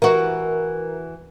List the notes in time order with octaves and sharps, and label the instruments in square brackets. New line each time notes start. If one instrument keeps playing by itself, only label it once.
[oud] E3 F#4 [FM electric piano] A#4